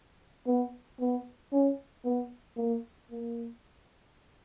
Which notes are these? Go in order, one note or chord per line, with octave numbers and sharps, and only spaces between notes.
B3
B3
C#4
B3
A#3
A#3